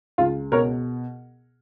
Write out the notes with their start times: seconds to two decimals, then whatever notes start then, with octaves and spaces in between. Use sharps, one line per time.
0.18 C#2 F4
0.52 B2 A#4 C#5